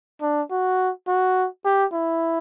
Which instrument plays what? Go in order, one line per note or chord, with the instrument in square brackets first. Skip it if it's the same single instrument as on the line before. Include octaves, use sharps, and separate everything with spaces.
[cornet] D4
F#4
F#4
G4
E4